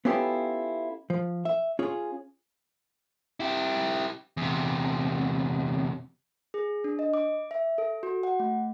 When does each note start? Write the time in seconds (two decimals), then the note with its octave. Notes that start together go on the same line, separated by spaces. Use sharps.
0.05 B3 C#4 E4 F4 G4 A4
1.10 F3
1.45 E5
1.79 C#4 F4 G#4
3.40 E4 G4
4.37 E2 C3
6.54 G#4
6.84 D4
6.99 D#5
7.14 D6
7.51 E5
7.78 A4
8.03 F#4
8.23 F#5
8.40 A3